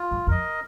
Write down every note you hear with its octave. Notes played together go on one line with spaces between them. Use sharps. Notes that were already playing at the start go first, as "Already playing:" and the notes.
Already playing: F4
G2
F2 A#4 D#5